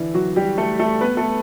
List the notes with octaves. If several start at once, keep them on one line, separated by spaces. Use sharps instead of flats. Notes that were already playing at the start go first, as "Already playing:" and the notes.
Already playing: D3 E3 D4 E4
F#3 F#4
G3 G4
A3 A4
A3 A4
B3 B4
A3 A4